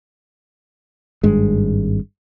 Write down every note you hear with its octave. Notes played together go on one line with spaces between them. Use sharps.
G#1 G2 G#3